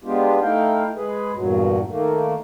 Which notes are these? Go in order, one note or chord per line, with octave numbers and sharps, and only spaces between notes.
G#3 B3 D4 F4 G4
A3 D#4 E4 F5 G5
G#3 G#4 B4
E2 G2 A#2 F#3
D#3 A3 A#3